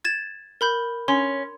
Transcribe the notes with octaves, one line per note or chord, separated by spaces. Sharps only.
G#6 A6 E7
A#4 B5 G6
C#4 C6